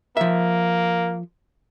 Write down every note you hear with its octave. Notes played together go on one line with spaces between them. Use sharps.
F3 A#3 E5